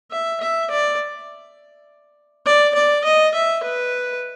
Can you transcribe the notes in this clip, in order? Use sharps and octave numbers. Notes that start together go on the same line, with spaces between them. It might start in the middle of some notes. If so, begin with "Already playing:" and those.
E5
E5
D5
D5
D5
D#5
E5
B4